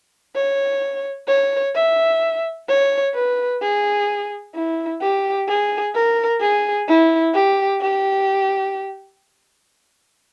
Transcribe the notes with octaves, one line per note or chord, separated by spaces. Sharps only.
C#5
C#5
E5
C#5
B4
G#4
E4
G4
G#4
A#4
G#4
E4
G4
G4